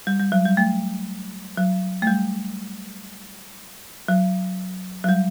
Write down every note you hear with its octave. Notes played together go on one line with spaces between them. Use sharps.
G3
G3
F#3
G3
A3
F#3
A3
G3
F#3
F#3
G3